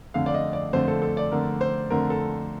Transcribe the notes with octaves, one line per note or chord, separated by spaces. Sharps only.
F2 D3 A3 F5
D5
D#5
D5
F2 D3 A3 C5
A4
A4
D5
F2 D3 A3 A#4
C5
F2 D3 A3 A#4
A4